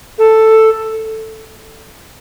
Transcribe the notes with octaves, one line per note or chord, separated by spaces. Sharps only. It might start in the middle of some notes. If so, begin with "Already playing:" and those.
A4